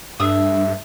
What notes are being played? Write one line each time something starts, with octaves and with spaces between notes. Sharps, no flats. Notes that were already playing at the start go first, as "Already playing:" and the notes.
G2 A3 D4 E5 D#6